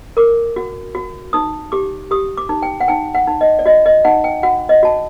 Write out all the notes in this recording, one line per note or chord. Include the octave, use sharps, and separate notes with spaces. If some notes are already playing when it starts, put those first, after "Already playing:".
A#4 D6
F#4
F#4
D#4 D#6
G4 D6
G4 D#6
D6
D#4
G5
F#5
D#4 G5
F#5
D#4
D#5
D5
F#4 D#5
D#5
D#4 F#5
G5
F#4 F#5
D#5
F#4 A5